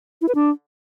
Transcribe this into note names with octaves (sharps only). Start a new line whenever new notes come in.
E4
B4
D4